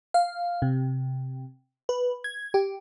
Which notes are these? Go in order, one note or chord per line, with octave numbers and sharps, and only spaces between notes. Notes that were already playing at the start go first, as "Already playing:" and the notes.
F5
C3
B4
G#6
G4